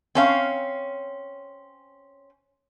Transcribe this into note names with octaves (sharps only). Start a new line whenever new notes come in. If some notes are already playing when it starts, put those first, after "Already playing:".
C4 C#4 F5